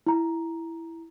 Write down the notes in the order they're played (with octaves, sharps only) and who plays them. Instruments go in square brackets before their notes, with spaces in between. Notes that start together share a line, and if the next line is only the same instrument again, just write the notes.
[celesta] E4 A#5